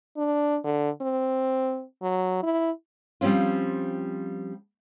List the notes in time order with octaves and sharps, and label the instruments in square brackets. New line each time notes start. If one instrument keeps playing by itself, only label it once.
[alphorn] D4
D3
C4
F#3
E4
[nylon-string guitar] F3 G3 C4 C#4 F4